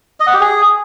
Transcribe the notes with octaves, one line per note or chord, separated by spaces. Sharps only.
D#5
F#5
G4
G#4